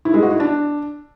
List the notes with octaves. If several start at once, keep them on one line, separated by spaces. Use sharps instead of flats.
E4
G#3
F#4
E4
D4